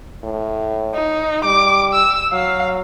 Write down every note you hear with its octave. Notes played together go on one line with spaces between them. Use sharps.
A2
D#4
G3 D6
E6
F#3 F5